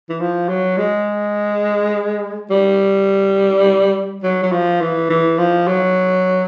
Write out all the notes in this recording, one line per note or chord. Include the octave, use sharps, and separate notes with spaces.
E3
F3
F#3
G#3
G3
F#3
F#3
F3
E3
E3
F3
F#3